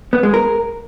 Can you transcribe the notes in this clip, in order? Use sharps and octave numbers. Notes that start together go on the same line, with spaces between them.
B3
G#3
A#4